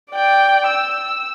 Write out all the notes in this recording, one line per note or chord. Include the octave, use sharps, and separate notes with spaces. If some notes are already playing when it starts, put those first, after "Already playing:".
D5 G5
E6